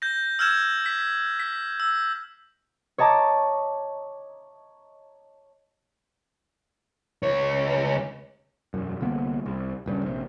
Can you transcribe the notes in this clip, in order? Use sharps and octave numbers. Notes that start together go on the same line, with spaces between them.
G6 A#6
E6 F6 G6 G#6 E7
B6
B6
E6
C#5 D#5 A5 A#5 D6
C#2 C#5
E1 F#2
C2 D3 A#3 B3
C2
D#1 G2 C#3
A#1 C3